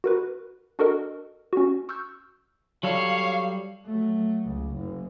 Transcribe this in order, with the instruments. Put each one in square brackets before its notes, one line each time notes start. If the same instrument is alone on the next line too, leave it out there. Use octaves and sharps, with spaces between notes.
[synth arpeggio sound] F#4 A#4 B4
D4 F#4 A4 A#4 D#5
C#4 F#4
C#6 E6 F6 G6
[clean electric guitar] F#3 G3 A4 [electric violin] C#5 [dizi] F5
[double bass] F#3 A3
C#2
F#1